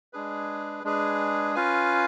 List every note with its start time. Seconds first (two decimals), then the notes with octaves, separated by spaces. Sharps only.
0.13 G#3 D4 G#4 B4
0.84 G#3 D4 G#4 B4
1.55 C#4 F4 B4 F5 G#5